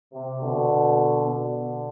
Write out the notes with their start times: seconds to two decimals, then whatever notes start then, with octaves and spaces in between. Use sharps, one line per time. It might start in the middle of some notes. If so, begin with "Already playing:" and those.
0.13 C3
0.41 B2 D3
1.27 B2 D3